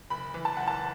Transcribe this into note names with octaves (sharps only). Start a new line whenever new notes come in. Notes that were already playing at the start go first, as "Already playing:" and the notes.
F#1 B5
E3
A5
F#1 F#5
A5